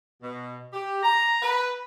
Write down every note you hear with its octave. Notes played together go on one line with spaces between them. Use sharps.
B2
G4
A#5
B4